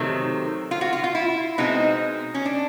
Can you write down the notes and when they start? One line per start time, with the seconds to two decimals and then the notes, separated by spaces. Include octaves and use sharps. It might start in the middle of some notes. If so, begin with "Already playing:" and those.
Already playing: C3 D#3 F#3 A3 C4
0.71 F4
0.81 F#4
0.93 F4
1.04 F4
1.15 E4
1.58 B2 G#3 C4 D#4
2.34 C#4
2.45 D4